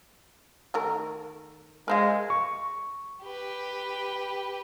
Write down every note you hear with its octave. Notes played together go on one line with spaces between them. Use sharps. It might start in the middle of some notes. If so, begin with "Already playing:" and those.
D#3 A3 A#4
G#3 A#4 C5 F5
C#6
G4 B4